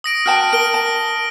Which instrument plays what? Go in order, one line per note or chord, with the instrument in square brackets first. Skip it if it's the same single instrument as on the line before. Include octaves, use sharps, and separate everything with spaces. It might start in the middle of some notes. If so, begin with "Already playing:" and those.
[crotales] D#6 A#6 D7
[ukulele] F#4 G5 A5 [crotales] F6
[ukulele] A#4 [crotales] D7 G7
[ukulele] A5